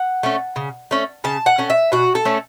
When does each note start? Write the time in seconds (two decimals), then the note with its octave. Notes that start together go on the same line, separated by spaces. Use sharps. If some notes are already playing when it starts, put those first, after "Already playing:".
Already playing: F#5
0.23 A3 C#4
0.56 C#3
0.91 A3 C#4
1.24 C#3 A5
1.46 F#5
1.58 A3 C#4
1.70 E5
1.92 B2 F#4
2.15 A4
2.25 A3 C#4